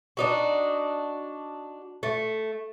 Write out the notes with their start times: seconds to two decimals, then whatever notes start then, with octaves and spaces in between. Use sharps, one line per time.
0.17 D4 D#4 F#4
2.03 A3